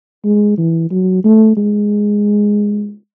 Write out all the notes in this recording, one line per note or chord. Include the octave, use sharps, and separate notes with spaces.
G#3
E3
F#3
A3
G#3